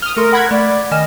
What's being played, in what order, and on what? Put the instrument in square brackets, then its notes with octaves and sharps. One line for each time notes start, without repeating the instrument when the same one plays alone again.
[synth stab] D#6 F6 [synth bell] G7
[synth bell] A3 A4 C6 [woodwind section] A#4
[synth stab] F#5 B5 G#6
[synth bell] A3 [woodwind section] D5
[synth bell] D#3 G#5 E7 [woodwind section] D#5 F6